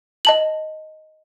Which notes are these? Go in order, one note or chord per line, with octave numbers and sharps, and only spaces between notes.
D#5 A5 F#7